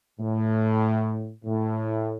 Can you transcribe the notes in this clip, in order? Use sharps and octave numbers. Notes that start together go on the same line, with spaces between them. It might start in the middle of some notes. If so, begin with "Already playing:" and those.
A2
A2